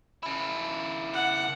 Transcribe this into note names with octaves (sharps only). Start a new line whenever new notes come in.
C#3 E4
F#5